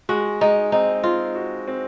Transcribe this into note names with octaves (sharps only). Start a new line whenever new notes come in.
G#3 F#4
G#3 D#4
C4 D#4
C4 F4
F#4
C4